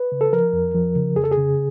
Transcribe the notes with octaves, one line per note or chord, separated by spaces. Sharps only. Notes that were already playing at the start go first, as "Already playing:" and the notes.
Already playing: B4
C#3
A4
F3 A#4
F2
F3
C#3
F2 G#4
A4
G#4
C#3